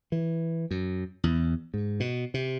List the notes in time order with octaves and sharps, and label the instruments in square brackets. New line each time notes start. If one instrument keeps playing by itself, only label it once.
[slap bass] E3
F#2
E2
G#2
B2
C3